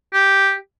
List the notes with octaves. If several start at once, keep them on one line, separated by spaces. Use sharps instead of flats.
G4